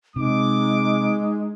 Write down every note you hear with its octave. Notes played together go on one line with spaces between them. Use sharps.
C3 G#3 D#4 D6